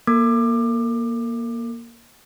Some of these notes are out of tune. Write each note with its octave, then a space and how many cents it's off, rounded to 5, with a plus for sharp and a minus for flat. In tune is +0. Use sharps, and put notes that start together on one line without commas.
A#3 +15 A4 +45 D6 +25